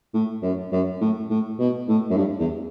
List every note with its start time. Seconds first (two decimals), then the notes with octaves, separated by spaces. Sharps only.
0.14 A2
0.42 F#2
0.72 F#2
1.01 A2
1.30 A2
1.59 B2
1.88 A2
2.10 F#2
2.17 G2
2.39 E2